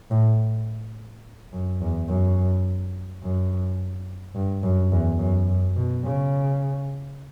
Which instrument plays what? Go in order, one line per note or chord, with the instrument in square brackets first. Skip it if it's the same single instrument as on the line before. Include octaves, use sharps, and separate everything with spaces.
[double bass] A2
F#2
E2
F#2
F#2
G2
F#2
E2
F#2
F#2
B2
C#3